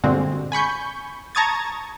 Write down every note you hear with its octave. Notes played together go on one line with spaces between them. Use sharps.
G2 A#2 D3 G#3 C4 F#4
G#5 B5 C#6 G6
A5 A#5 C#6 D#6 G#6 A6